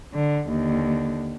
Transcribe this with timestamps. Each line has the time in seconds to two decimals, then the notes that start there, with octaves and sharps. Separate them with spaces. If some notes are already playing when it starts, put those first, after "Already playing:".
0.14 D3
0.50 D#2 D3